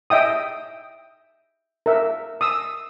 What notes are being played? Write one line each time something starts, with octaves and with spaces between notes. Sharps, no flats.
D#5 E5 G5 D#6
A#4 E5
D#6 E6